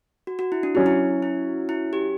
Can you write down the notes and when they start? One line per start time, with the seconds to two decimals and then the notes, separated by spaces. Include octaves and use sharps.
0.27 F#4
0.39 F#4
0.52 E4
0.63 D4
0.75 F#3 C#4 E4 F#4
0.86 E4
1.22 E4
1.69 E4
1.93 G4